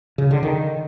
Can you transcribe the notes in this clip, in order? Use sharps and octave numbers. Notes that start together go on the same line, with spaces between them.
C#3
D3
D#3